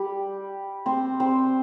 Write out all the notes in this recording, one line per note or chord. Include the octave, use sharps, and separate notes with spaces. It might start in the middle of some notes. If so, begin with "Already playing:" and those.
Already playing: G3 G4
C4 C5
C4 C5